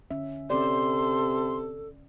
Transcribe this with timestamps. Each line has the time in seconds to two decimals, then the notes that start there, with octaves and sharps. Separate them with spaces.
0.11 D3 C#4 E5
0.50 C3 C#4 A4 D5 C6